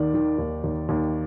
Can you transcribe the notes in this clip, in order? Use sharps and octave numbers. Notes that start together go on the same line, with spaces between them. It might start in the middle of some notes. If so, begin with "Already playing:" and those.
Already playing: D#2 D#3 D5
D#3
D#2
D#2
D#2